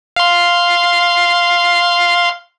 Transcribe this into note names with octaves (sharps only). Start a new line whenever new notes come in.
F5 C6